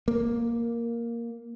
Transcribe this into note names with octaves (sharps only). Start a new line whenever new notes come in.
A#3